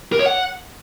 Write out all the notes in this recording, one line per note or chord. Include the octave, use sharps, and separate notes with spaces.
A#4
C#5
F#5